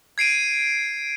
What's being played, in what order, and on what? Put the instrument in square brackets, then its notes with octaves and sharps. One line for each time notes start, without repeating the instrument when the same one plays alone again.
[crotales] G#6 C7 D7 D#7